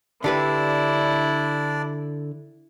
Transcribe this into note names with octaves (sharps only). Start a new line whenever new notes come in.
D3 D4 E4 G4 B4 D5